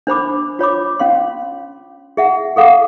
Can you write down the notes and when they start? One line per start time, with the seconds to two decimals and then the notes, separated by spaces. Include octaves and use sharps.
0.07 D4 C5 B5 D6
0.59 F4 C#5 B5 D6
0.99 C#4 F5 C6
2.17 G#4 E5 F#5
2.56 G#4 A4 F5 F#5 D6